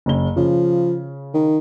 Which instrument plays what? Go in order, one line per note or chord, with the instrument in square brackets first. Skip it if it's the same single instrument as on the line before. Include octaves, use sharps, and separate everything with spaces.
[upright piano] F#1 C#3 G7
[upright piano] C#3 [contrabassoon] F3
[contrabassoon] D#3